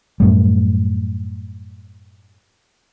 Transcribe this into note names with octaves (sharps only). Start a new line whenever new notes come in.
F#2 A2 G3